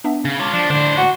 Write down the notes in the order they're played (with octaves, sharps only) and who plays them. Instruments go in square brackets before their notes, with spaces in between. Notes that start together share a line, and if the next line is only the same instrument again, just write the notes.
[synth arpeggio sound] B3 D4 E5
[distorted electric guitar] C#3
[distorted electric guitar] F4 C#5 [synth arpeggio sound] A5 D6
[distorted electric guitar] F3 [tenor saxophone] D4
[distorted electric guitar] A2 C5 [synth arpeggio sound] D3 [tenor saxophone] D4
[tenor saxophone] F#4